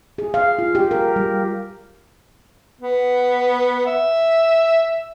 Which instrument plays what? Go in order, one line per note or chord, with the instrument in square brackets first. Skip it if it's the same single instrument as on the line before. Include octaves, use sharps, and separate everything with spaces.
[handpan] G#4
F5
F4
G4
A#4
G3
[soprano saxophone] B3
E5